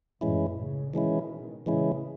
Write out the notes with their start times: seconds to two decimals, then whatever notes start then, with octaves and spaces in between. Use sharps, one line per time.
0.21 F#2 A2 E3 G#3 C#4 E4
0.57 A2 C#3
0.94 B2 D#3 E3 G#3 C#4 E4
1.66 A2 C#3 E3 G#3 C#4 E4